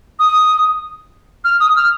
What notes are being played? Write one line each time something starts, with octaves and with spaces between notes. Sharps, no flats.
D#6
F6
D#6
F6